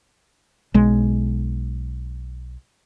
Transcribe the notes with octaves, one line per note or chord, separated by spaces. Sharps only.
B1 G#3